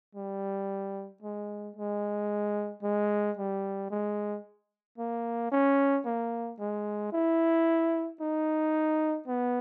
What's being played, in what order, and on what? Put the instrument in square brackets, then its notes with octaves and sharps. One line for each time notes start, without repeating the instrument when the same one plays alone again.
[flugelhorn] G3
G#3
G#3
G#3
G3
G#3
A#3
C#4
A#3
G#3
E4
D#4
B3